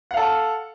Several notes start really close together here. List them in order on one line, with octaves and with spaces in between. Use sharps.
F#5 F5 A4